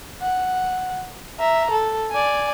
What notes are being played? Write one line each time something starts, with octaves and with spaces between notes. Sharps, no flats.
F#5
E5 A#5
A4
D5 G#5